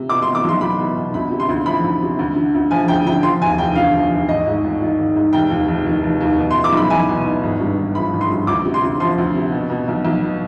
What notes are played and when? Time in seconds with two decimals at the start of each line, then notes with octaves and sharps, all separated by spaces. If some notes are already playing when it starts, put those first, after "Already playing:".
Already playing: C3
0.09 B2 D6
0.22 C6
0.27 B2
0.35 D6
0.44 B1 C6
0.61 B1 B5
0.78 B2
0.97 B2
1.14 D2 B5
1.31 C3
1.40 C6
1.49 D2
1.66 F3 B5
1.84 D2
2.02 C3
2.19 D2
2.36 D3
2.54 D2
2.71 F3 G#5
2.88 D2 G5
3.06 D3 G5
3.23 F3 C6
3.42 D#2 G#5
3.58 F1 G5
3.75 D3 F5
3.94 F3
4.11 D#2
4.28 G#1 D#5
4.47 G#2
4.64 G#1
4.81 D#3
4.98 G#1
5.16 G#2
5.33 F1 G5
5.51 D#2
5.68 F1
5.86 D#3
6.03 F1
6.21 D#2
6.38 B2
6.51 C6
6.55 B2
6.64 D6
6.73 B1 B5
6.90 B1 G#5
7.08 B2
7.25 B2
7.43 G#1
7.60 G2
7.78 G#1
7.95 F3 B5
8.13 G#1
8.21 C6
8.31 G2
8.47 D2 D6
8.65 C3
8.74 C6
8.82 D2
9.00 F3 C6
9.18 D2
9.35 C3
9.52 B2
9.70 B2
9.88 B1
10.05 B1
10.22 B2